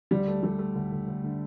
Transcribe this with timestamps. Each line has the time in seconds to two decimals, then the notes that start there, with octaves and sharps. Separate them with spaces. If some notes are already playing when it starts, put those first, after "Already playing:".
0.11 D2 G3
0.28 A3
0.43 G3 A3
0.59 A3
0.76 D2
0.92 D2
1.08 D2
1.24 D3